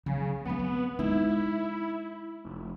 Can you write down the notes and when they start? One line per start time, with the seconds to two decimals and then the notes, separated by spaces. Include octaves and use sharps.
0.06 C#3 F#3
0.45 F#3 B3 C4
0.99 G#3 D#4 E4
2.45 F1